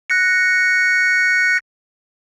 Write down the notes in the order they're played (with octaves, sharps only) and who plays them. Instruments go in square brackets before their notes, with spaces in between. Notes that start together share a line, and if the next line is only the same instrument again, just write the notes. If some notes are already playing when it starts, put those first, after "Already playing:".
[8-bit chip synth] F#6 A#6 C#7